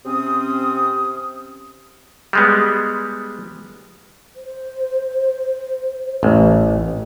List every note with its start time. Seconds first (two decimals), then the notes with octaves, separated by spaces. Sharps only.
0.06 C3 C4 C#4 D#6
2.33 G3 G#3 B3
4.36 C5
6.23 A1